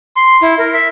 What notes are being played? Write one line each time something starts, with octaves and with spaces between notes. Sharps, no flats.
C6
E4
A#4
E5